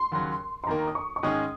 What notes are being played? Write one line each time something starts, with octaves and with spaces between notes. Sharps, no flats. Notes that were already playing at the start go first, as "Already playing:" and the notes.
Already playing: C6
D#2 C#3 F#3
C6
D#2 D#3 A#3 A#5
D#6
C#6
C#6
G#2 D#3 G#3 C#4 G#4 D#6